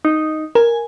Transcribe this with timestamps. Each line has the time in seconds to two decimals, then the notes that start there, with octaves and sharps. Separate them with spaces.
0.05 D#4
0.55 A#4 G#5